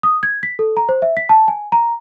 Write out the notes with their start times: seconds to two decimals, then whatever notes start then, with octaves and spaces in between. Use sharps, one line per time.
0.03 D#6
0.23 G#6
0.43 B6
0.59 A4
0.77 A#5
0.89 C5
1.02 E5
1.17 B6
1.29 A5
1.48 G#5
1.72 A#5